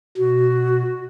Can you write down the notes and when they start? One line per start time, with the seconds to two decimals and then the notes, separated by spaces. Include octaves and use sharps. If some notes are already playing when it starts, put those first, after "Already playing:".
0.18 B2 F#4